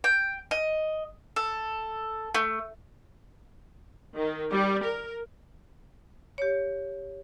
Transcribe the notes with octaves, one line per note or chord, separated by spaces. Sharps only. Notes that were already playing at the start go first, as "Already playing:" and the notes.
G5
D#5
A4
A3
D#3
G3
A#4
G4 C#5